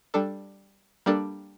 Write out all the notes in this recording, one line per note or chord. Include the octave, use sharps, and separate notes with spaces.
G3 D4 A4
G3 A#3 D4 A4